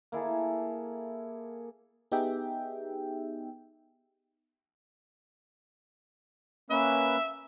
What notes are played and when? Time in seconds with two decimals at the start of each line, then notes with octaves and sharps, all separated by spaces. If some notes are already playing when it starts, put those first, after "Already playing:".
0.12 A#3 E4 G#4 A4
2.12 B3 D#4 G4 G#4 E5 G5
6.70 A#3 C#4 B4 E5